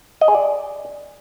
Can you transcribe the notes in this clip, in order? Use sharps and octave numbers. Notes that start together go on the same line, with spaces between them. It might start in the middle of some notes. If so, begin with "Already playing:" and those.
D#5
G#4
D5